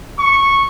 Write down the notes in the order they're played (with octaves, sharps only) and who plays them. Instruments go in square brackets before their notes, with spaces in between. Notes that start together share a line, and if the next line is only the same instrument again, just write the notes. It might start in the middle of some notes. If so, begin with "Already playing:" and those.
[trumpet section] C#6